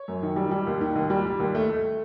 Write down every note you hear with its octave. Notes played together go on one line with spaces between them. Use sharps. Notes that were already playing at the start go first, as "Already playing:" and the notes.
Already playing: C#5
F#2
D#3
G3
G3
D#2
D#3
D#2
G3
G3
D#2
A3
A3